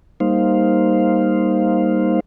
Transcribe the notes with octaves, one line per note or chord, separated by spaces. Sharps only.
G3 A#3 D#4 C5 F5